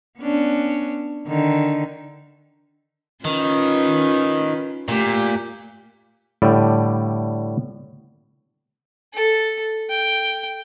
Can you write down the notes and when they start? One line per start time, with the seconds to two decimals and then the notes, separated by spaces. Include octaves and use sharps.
0.19 B3 C#4 D4
1.27 D3 D#3
3.25 D#3 C#4 F4 B4
4.88 A#2 A3 G4
6.42 A2 D3 G3 D5 G5
9.14 A4
9.90 G5